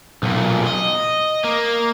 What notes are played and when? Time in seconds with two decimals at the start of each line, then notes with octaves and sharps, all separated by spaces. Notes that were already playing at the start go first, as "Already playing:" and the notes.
0.23 B1 A#2
0.67 D#5
1.44 A#3